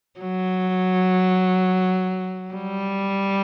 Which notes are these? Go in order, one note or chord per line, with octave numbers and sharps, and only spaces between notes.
F#3
G3